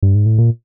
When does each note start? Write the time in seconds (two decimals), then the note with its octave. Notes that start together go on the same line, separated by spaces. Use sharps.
0.03 G2
0.15 G#2
0.26 A2
0.38 A#2